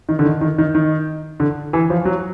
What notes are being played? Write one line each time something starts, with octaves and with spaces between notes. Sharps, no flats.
D#3
D3
D#3
D#3
D#3
D#3
D3
E3
F3
F#3